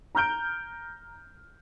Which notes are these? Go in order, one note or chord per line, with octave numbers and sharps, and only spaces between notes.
A#5 F6 G6 D7